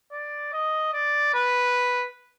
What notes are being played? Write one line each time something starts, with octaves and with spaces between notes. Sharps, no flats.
D5
D#5
D5
B4